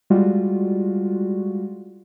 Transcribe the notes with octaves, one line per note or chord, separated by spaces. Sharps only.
G3 G#3 F4 F#4